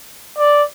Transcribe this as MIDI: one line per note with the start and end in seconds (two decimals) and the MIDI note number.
0.38 0.63 74